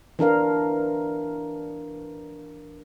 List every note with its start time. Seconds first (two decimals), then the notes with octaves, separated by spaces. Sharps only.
0.19 E3 D4 A#4 F5